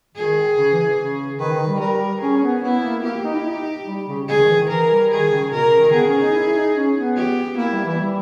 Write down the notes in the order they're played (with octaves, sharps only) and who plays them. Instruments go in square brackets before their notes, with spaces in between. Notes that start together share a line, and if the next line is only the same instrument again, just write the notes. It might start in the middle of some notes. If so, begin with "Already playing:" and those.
[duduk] D#3 [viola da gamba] G#4
[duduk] C#3
E3
C#3
[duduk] D#3 [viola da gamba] B4
[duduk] D#3
G3
[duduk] G3 [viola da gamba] A#4
[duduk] C#4 [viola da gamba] G#4
[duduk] C#4
B3
[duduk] B3 [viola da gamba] E4
[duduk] A#3
[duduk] A#3 [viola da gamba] G4
[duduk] D#4
E4
D#4
G3
C#3
[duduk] C#3 [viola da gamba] G#4
[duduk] D#3
E3
D#3
[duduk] E3 [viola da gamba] A#4
[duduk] G3
[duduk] D#3 [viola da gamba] G#4
[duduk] C#3
[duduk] B2 [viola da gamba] A#4
[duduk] C#3
D#3
[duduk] B3 [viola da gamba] G#4
[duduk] C#4
D#4
E4
D#4
C#4
B3
[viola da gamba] G4
[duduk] A#3 [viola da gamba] E4
[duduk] G3
E3
G3